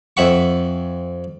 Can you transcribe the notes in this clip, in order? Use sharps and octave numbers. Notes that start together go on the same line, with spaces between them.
F2 E5 F#5 C#6